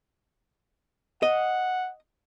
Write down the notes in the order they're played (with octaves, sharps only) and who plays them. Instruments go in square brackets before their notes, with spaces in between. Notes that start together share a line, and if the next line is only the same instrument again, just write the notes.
[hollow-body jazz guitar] D#5 [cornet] F#5